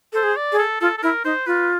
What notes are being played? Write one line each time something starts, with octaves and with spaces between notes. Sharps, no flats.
A4 C5
G#4
D5
G#4
A4
F4 A4
A4
E4 A#4
D#4 C5
F4 B4